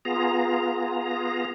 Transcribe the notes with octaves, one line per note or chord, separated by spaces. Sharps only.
B3 F4 G#4 A#5